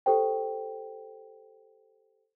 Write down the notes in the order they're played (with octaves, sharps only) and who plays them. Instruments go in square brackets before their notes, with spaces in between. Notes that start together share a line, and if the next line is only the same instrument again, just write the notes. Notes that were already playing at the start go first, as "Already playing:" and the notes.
[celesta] G4 A4 C5 G5